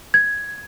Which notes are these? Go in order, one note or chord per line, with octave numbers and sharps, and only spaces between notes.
G#6